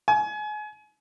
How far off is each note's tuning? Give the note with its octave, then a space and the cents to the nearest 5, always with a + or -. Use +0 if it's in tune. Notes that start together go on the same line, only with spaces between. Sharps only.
G#5 +30